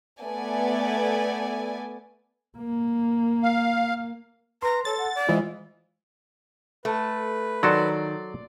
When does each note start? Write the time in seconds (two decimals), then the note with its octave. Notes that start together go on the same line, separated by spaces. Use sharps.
0.21 A3 B3 A4 D5 G#5
2.58 A#3
3.43 F5
4.63 B4 A#5 C6
4.85 A4 C#5 A6
4.98 F#5
5.15 D5
5.29 E3 G#3 F4 C5 D#5
6.85 A3 B4
7.63 D#3 F#3 F#4 A4 D5 C6